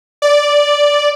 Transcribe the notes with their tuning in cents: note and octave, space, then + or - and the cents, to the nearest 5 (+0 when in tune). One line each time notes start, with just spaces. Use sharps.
D5 -5